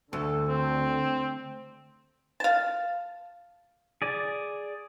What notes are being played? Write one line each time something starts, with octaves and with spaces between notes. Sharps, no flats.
D2 D3 A4
C4
F5 A5
G#4 D5